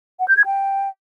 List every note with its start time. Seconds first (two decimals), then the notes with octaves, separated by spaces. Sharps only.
0.19 F#5
0.28 G6
0.37 G#6
0.46 G5